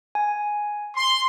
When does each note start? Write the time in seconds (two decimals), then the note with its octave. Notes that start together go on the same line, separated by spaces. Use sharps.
0.15 G#5
0.95 C6